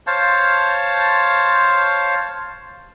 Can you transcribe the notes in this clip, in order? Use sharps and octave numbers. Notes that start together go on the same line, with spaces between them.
C5 C#5 F5 A5